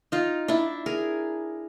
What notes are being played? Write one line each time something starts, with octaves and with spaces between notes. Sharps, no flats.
D#4 F4
D4 E4
G#4 A#4